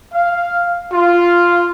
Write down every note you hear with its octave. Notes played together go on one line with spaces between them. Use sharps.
F5
F4